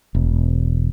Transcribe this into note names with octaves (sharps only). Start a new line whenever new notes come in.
E1